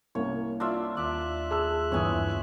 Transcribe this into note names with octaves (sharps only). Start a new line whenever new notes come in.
C2 A#3 C#4 C#5
D4 F4 E5
D#2 D5 E5 F#6
G#4 A5 E6
G1 E2 C#5 G#5 D#6